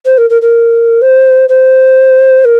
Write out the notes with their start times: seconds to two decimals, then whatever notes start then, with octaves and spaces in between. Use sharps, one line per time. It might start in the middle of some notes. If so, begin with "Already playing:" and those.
0.05 C5
0.17 A#4
0.29 A#4
0.41 A#4
1.01 C5
1.49 C5
2.44 A#4